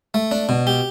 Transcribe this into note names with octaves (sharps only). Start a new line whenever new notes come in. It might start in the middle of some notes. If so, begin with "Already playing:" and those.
A3
D4
B2
G4